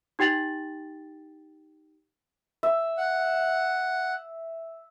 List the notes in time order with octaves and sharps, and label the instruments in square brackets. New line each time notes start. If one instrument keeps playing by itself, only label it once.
[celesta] D#4 G4 G5 A6 F7 F#7
[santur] E5
[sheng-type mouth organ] F#5